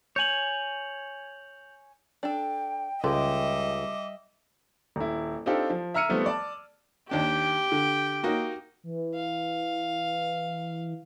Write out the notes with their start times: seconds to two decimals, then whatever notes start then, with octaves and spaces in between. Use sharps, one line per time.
0.16 C#5 G#5 G6 F7 F#7
2.23 D4 A4 G5
3.04 C#2 G3 G#3 G4 A4 D#5 E5 D6
4.96 D#1 E4
5.46 C4 D4 D#4 F4 G4 A4
5.70 F3
5.94 E5 A#5 E6 F6 C#7 D#7
6.09 D#3 F3 G3 A3 B3 C4
6.26 D5 A5
7.11 D#2 D4 G4 G5
7.72 D3
8.23 A#3 D#4 F#4
8.83 E3
9.14 F5